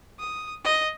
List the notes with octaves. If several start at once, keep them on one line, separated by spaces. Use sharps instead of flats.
D#6
D#5